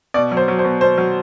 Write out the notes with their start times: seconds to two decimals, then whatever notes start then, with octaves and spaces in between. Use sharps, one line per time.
0.14 B2 D5
0.31 F#3
0.37 C5
0.48 F#3
0.59 C5
0.64 B2
0.81 B2 C5
0.98 F#3